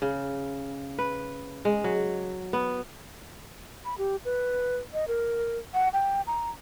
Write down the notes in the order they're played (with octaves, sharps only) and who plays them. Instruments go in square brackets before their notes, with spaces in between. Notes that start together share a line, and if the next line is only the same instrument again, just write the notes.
[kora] C#3
B4
G#3
F#3
B3
[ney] B5
G4
B4
D#5
A#4
F#5
G5
A#5